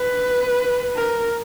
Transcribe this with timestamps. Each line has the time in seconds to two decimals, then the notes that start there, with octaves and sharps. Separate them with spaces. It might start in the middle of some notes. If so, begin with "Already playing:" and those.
Already playing: B4
0.96 A#4